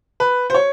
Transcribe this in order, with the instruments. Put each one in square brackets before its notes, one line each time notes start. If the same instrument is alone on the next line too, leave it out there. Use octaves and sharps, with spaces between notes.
[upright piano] B4
C5
C#5